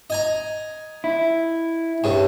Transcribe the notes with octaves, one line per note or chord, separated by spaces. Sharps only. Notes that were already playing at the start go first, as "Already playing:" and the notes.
D#5 G#5 A#5
E4
G2 C#3